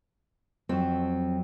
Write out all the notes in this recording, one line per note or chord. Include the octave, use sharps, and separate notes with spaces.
F2 F#3 C4